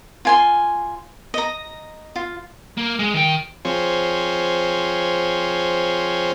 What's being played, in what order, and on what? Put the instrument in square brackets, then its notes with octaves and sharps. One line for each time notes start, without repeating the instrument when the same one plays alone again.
[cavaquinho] F4 G#5 C6
D#5 A#5
F4
[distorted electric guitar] A#3
G#3
D#3 G5
[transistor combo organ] F3 C4 G#4 C#5